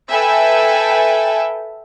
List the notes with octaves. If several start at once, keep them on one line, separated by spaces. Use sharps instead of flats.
A4 B4 E5 G5 G#5